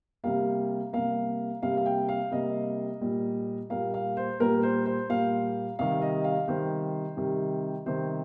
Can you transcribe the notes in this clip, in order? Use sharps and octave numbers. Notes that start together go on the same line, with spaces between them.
C3 G3 A#3 F5
C3 G3 A#3 F5
C3 G3 A#3 F5
F5
G5
F5
C3 G3 A#3 D#5
A#2 G3 A#3
A#2 G3 A#3 F5
F5
C5
A#2 G3 A#3 A#4
C5
C5
A#2 G3 A#3 F5
C3 D#3 G3 F5
D#5
F5
C3 D#3 G3 C5
C3 D#3 G3
C3 D#3 G3 C5